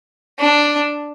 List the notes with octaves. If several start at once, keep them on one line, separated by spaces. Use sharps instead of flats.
D4